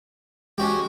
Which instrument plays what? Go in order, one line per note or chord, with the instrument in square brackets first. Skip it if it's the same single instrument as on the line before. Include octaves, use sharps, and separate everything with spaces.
[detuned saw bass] G#3 [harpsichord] C#4 F#4 G4